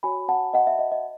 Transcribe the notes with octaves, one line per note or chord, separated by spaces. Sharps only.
F#4 C#5 G#5 B5
F#5 A5
D#5 F#5
E5
D#5
D#5